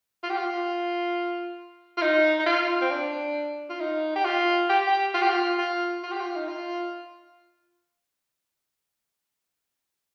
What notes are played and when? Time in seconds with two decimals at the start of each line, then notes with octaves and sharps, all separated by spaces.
0.23 F4
0.30 G4
0.38 F4
1.97 F4
2.02 D#4
2.39 D#4
2.46 F4
2.81 C4
2.91 D4
3.69 F4
3.80 D#4
4.15 G4
4.25 F4
4.69 G4
4.87 G4
5.14 F4
5.22 G4
5.29 F4
5.59 F4
6.03 F4
6.12 G4
6.20 F4
6.35 D#4
6.48 F4